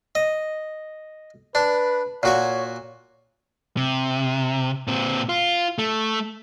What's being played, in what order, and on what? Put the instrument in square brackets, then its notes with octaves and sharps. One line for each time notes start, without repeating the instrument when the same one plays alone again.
[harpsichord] D#5
[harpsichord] D4 [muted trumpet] B4
[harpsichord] A#2 F#4 C#6 [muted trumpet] C#5
[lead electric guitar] C3
A#2 C4
F4
A3